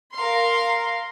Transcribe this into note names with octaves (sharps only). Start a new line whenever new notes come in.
A#4 F5 C6